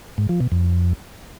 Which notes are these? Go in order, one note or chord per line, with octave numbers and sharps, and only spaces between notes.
G#2
F3
B2
F2